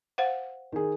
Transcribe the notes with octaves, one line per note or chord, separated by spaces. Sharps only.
C5 F5 F#5
D#3 G#4